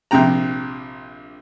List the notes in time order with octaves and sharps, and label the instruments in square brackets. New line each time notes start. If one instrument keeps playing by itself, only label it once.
[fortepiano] A#1 C3 G5 A#5